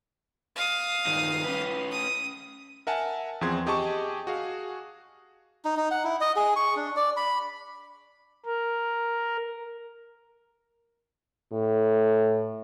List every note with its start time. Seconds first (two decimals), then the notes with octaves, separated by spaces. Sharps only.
0.56 F5 D#6
1.07 G2 D#3
1.44 C#4 B4
1.91 D#6
2.87 A#4 E5 F#5 G#5 A5
3.41 E2 F3 C4 G#4 C6 G#6
3.66 G4 G#4 D#5 A5 C#6
4.27 F#4 G#4 F5
5.65 D#4
5.77 D#4
5.91 F#5
6.04 E4
6.21 D#5
6.36 G#4
6.56 C#6
6.76 D4
6.96 D5
7.17 B5
8.46 A#4
11.53 A2